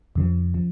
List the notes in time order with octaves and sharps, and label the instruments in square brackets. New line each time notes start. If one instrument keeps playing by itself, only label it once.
[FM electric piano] F2 C#3 F3
C#3 F3